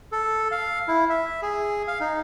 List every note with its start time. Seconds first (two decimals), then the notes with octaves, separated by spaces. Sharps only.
0.12 A4
0.51 F5
0.88 E4
1.09 E5
1.42 G#4
1.88 F5
2.00 D#4